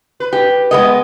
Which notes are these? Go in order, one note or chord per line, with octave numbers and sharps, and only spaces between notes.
B4
G4
G#3 B3 D#5